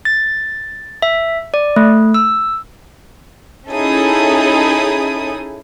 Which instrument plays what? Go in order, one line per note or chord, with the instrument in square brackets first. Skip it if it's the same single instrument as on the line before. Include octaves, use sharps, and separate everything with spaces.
[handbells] A6
E5
D5
A3
E6
[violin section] C#4 D#4 E4 G#4 A4 D#6